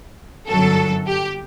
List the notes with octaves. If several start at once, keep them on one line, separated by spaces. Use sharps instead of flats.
G1 F#2 F#3 A4
G4